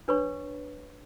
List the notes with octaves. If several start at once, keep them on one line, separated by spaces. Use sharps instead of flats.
D4 B4 C#5 C#6